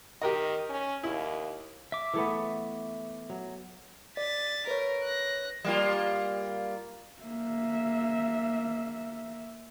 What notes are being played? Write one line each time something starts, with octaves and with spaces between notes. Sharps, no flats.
D#3 G4 A#4 D#5
C#4
D#2 E4
E5 D6
E3 A3 B3
F#3
D5 A6 B6
A#4 B4 C#5
F#6 A#6
G3 A#3 F4
A#3 E5